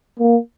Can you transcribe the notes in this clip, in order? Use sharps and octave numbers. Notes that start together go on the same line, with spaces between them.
A#3